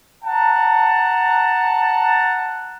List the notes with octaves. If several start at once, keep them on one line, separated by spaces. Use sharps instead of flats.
F#5 A5 A#5